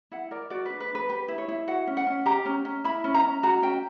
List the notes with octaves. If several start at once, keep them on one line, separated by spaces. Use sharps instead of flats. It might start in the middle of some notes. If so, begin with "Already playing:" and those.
E4 F#5
A#4 D5
F#4 D5
D4 B4
B4
D4
B4
G4 B4
E4
C#5
E4
F#4 F#5
C#4
F#5
C#4
G4 A#5
C#4
C#4
E4 B5
C#4
A#5
C#4
F#4 A#5
C#4 G5